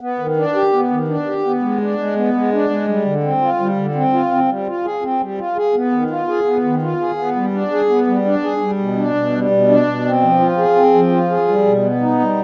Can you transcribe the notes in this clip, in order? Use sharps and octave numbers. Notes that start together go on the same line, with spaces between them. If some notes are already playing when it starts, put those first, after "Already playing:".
B3
D#3
D4
G4
B3
D#3
D4
G4
B3
G#3
D4
G#3
B3
G#3
D4
G#3
G3
D3
C4
F4
G3
D3
C4
F4
C4
G3
F4
G#4
C4
G3
F4
G#4
B3
D#3
F4
G#4
B3
D#3
F4
G#4
B3
G3
D4
G#4
B3
G3
D4
G#4
G3
B2
D4
B2
G3
B2
D4
B2
C4
F3
F4
G#4
C4
F3
F4
G#4
G3
B2
B3
D#4
G3